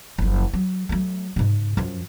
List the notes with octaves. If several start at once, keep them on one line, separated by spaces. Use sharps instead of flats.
F#1 F3
F#3
F#3 A3
G#2 C#3
F#2 F3